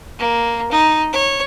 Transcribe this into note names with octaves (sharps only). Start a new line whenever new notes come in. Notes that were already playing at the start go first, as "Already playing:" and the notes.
A#3
D#4
C#5